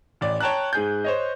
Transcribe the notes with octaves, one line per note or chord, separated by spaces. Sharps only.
A1 D5
C#5 G5 A5 A#5 F#6
G#2 G#4 G6
C5 C#5 D#5